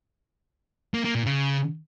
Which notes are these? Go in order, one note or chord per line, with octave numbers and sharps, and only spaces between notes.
A#3
A#3
A#2
C#3